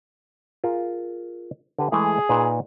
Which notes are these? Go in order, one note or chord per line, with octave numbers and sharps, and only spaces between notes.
F4 G#4 A#4
D3 G4 B4
E3 G#3 A3 G#4
A#2 D#4 B4